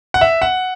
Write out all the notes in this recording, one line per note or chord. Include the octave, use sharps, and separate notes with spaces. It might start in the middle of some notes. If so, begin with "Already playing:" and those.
F#5
E5
F#5